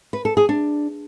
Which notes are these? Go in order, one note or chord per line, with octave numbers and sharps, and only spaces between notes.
B4
A4
G#4
D4